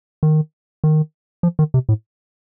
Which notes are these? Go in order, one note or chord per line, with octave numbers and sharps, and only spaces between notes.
D#3
D#3
F3
D#3
C3
A2